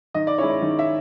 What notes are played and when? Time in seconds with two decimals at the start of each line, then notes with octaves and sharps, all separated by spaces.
0.14 D#3 D#5
0.27 D5
0.38 G#3 C#4 E4 C#5
0.50 C#5
0.62 D#3
0.79 E5